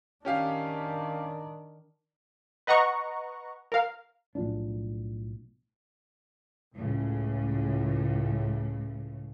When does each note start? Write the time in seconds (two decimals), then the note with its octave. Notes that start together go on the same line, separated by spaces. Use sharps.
0.25 D#3 C#4 D4 G4 F5
2.67 B4 D#5 F#5 A#5 C#6
3.72 A#4 F5
4.35 B1 A2 F3 D4
6.74 C#2 A2 C#3